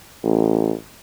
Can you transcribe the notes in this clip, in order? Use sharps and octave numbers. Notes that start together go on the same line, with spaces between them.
A1